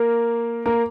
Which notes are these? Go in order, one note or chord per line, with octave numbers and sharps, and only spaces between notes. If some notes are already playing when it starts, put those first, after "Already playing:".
Already playing: A#3 A#4
A#3 A#4